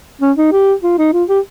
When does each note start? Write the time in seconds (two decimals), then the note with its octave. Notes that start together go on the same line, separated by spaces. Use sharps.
0.21 C#4
0.37 D#4
0.52 G4
0.83 F4
0.99 D#4
1.13 F4
1.29 G4